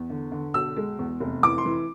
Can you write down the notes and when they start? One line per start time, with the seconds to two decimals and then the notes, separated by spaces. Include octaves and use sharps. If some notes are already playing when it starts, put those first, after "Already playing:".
Already playing: E2
0.10 D3
0.32 D3
0.54 B1 E6
0.77 G#3
0.99 E2
1.20 F1
1.43 E3 D6
1.58 C6
1.66 E3